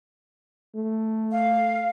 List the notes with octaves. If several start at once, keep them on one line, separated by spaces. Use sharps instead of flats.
A3
F5